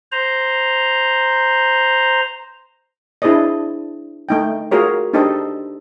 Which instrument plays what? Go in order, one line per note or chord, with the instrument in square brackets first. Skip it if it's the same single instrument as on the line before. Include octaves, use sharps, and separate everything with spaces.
[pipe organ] C5 A#5
[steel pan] D4 E4 G#4 C5 D5 D#5
A3 D#4 G5
F4 F#4 G#4 A#4 C#5
D4 D#4 G4 A4 C5 D#5